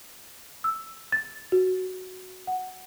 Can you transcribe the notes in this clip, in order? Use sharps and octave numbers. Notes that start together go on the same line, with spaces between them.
E6
A6
F#4
F#5